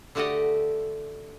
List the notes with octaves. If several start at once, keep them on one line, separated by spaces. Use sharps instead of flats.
D3 A3 F#4 G4 D#5 F#5